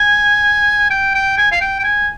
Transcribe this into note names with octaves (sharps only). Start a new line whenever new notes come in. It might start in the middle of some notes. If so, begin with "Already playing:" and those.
Already playing: G#5
G5
G5
G#5
F5
G5
G5
G#5